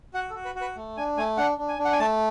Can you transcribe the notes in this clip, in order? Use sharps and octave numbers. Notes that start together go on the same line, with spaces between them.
F#4 F#5
A4
F#4
B4
F#4
B4
A3
D4 G#5
A3 G#5
D4 F#5
D4
G#5
D4
F#5
G#5
A3 A5